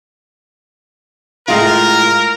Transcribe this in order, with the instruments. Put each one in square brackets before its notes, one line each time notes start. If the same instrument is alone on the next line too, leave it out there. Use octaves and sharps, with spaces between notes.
[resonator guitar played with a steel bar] A2 G#3 F4 [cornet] A#4